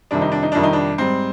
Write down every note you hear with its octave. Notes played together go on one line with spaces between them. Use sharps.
F2 C3 D#3 G3 D4
D#4
D4
D#4
F2 C3 D#3 G3 D4
D#4
D4
G#2 G3 C4